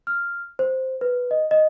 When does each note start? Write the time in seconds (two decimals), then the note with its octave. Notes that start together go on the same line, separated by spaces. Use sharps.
0.07 F6
0.59 C5
1.01 B4
1.31 D#5
1.51 D#5